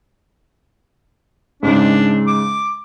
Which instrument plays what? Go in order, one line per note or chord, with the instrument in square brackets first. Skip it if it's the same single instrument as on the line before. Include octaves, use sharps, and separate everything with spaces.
[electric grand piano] G#2 C#3 G#3 [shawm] D4
[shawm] D6